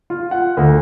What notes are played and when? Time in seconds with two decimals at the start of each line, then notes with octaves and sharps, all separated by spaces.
0.10 F4
0.31 F#5
0.57 D2